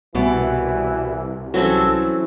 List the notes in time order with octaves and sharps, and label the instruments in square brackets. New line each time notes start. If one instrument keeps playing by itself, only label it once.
[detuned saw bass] C2 [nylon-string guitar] B2 D5 [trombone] E3
[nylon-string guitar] E3 [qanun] F#3 C4 C#4 [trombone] A4